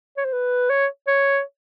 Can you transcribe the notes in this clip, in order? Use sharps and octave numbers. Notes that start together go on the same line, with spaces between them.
C#5
C5
B4
C#5
C#5